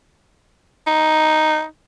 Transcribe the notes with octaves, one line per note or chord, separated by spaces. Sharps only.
D#4